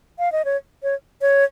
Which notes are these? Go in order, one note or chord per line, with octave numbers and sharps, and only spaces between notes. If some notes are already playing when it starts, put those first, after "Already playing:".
F5
D#5
C#5
C#5
C#5